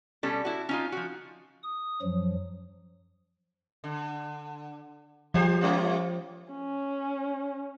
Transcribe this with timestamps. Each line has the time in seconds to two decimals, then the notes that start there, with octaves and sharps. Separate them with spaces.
0.23 B2 G3 C#4 A4
0.45 E4 F#4
0.69 C#4 D#4 F4
0.92 F3 F#4
1.63 D#6
2.02 F#2 F3 F#3
3.84 D3
5.34 F3 F#3 G4 C5
5.61 G3 C#4 F4
6.52 C#4